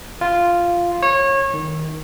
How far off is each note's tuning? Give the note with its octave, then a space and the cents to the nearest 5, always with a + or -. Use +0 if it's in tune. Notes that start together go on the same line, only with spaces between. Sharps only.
F4 -5
C#5 -25
D#3 +15